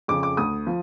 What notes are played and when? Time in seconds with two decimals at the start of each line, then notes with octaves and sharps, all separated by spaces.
0.08 F2 C#3 D6
0.23 D6
0.37 D2 D#6
0.67 F3